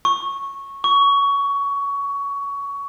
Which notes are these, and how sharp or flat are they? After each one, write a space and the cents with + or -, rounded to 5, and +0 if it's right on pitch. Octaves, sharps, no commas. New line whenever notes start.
C#6 -10
C#6 +20